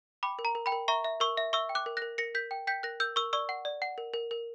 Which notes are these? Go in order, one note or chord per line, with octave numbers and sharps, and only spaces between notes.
G5 B5 D6
A#4
A#5
A#4
G5 B5
A#4
E5 A#5 C#6
E5
A#4 C#6 E6
E5
E5 C#6 E6
G5
D6 F#6
A#4
A#4 F#6 A#6
A#4 A#6 C#7
A#4 G6 B6
G5
G5 G6 B6
A#4 F#6 A#6
A#4 E6 G6
A#4 C#6 E6
D5 C#6 E6
F#5
D5
F#5
A#4
A#4
A#4